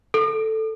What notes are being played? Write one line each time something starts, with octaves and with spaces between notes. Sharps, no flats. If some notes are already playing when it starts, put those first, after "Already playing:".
A4